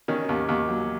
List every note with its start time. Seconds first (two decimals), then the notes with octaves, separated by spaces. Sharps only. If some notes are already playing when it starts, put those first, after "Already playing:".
0.08 D#3 C#4
0.29 D#2
0.48 D#2
0.68 F#3